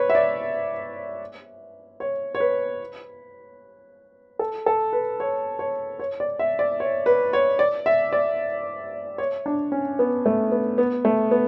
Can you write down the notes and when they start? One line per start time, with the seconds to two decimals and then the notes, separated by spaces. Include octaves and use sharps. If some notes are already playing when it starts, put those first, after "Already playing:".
Already playing: B4 C#5
0.10 E5
0.15 D5
2.00 C#5
2.35 C#5
2.40 B4
4.39 A4
4.66 A4
4.93 B4
5.20 C#5
5.59 C#5
5.99 C#5
6.20 D5
6.39 E5
6.59 D5
6.80 C#5
7.06 B4
7.33 C#5
7.59 D5
7.86 E5
8.13 D5
9.18 C#5
9.46 D4
9.72 C#4
9.99 B3
10.26 A3
10.52 B3
10.78 B3
11.05 A3
11.31 B3